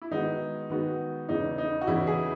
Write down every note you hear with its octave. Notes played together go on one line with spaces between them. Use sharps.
E4
D#3 G#3 B3 D#4 F#4
D#3 G#3 B3 F#4
E2 C#3 E3 D#4
D#4
F#4
E2 C#3 E3 E4
G#4